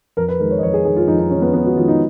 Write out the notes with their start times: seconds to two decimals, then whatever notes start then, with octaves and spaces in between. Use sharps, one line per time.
0.17 F2 A#4
0.28 B4
0.40 D#3 G#3 A#4
0.51 C#5
0.58 D#5
0.62 F2 C#5
0.74 G#4
0.85 D#3 G#4
0.88 G#3
0.97 F4
1.08 F2 D#4
1.19 D#4
1.30 D#3 G#3 C#4
1.42 B3
1.53 F2 B3
1.65 F#4
1.76 D#3 F4
1.79 G#3
1.88 D#4